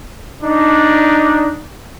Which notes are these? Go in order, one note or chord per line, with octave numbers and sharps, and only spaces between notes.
D4 D#4